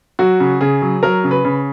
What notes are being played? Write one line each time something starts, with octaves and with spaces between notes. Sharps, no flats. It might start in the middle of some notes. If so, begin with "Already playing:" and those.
F#3 F#4
C#3
C#3 G#4
F#3
F#3 A#4
C#3
B4
C#3